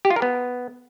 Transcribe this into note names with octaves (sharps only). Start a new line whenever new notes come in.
G4
F4
A#4
B3